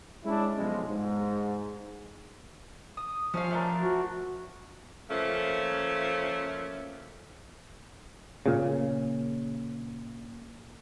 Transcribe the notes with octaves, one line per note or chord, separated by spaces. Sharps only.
G#3 C#4 D4 E4
B1 B2 F3 G#3
G#2
D#6
F3 C#4 C#5 F5
A3 D4 A#4
F#4
F3 A3 A#3 C#4
A#2 C#3